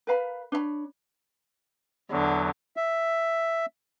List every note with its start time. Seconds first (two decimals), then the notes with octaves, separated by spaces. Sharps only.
0.07 A#4 B4 F5 B5
0.52 D4 C#5 E5 B5
2.11 E2 D3 F#3
2.77 E5